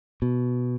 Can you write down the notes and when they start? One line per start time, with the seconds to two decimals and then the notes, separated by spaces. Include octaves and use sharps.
0.22 B2